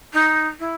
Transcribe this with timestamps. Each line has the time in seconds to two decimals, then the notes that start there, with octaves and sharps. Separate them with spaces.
0.13 D#4
0.59 E4